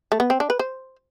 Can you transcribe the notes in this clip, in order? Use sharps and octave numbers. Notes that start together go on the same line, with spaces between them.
A3
B3
C4
D4
B4
C5